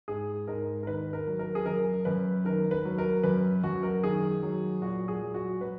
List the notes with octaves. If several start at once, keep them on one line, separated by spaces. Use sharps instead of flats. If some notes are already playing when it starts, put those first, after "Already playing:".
G#2 G#4
G#2 A#4
A#4
D#3 B4
A#4
F#3
A#4
G#4
F#2 A#4
F#2 B4
D#3 A#4
B4
F#3
A#4
F#2 B4
F#2 F#4
A#4
D#3 G#4
F#3
A#2 F#4
G#4
F#3
F#4
F#3 B4